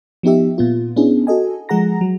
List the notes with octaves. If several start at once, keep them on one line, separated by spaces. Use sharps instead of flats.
F3 B3 D#4 G4 E5
A#2 B3 F4
B3 C#4 D4 E4 G#4
F#4 A4 D#5 G#5
F3 G#3 G#4 F#5 A#5 A#6
F#3